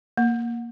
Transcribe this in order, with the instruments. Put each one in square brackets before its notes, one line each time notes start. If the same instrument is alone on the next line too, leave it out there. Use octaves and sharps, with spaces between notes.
[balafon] A#3